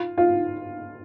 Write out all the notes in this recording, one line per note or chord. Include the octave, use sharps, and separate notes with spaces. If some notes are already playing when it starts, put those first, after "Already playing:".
Already playing: F4
F4